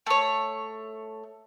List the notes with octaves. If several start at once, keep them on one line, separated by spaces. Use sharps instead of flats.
A3 C#5